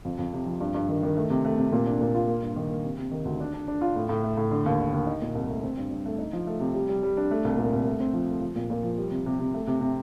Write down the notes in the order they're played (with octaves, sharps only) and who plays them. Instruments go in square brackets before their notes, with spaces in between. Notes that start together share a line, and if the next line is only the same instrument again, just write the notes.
[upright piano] F2
F2
C3
F3
G2
G2
D#3
D#3
A3
C3
A3
C3
A#2
D4
A#2
F4
A#3
G2
D#3
A#3
C3
C3
D#3
D2
D4
D4
D4
F4
A2
A2
A3
A2
D3
D#2
D3
D#2
D#4
A#2
C2
A3
C4
G2
G2
A3
D#4
F3
A3
C3
G3
G3
G3
D4
A3
C2
A#2
C2
A3
C4
F3
A3
F3
A#2
A#2
F3
G3
C3
C3
C3
A3
C3
C3